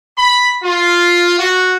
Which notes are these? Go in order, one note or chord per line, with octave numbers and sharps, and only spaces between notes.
B5
F4
F#4